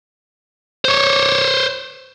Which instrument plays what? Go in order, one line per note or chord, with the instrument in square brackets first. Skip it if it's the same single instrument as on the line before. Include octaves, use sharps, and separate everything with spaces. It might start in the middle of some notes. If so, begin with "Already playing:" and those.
[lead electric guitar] C5 C#5